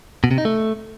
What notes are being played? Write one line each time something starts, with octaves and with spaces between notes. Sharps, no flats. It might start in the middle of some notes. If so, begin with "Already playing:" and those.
B2
C3
D#4
A3